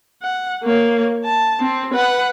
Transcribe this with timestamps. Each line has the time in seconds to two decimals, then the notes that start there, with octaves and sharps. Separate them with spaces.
0.22 F#5
0.63 A#3 C#5
1.25 A5
1.59 C4
1.94 B4 F#5